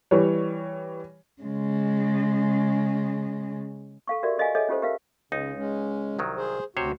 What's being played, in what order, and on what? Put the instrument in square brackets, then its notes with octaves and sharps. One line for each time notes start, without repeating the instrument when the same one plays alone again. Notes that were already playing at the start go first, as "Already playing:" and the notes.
[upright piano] E3 G3 C#5
[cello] C#3 G#3
[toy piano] A4 F5 C#6
F#4 G4 A#4 D5 E5
G4 A4 D#5 F5 G#5
G#4 A4 C#5 D#5 E5 G#5
C#4 F4 G4 A4 C5
G4 A#4 B4 E5 F5
[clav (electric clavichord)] C#2 D#4 [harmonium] C#3
[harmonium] G#3 C#4
[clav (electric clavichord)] C2 D#3 F#3
[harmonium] G#4 C5
[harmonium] D2 F#4 [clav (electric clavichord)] C3 C5 C#5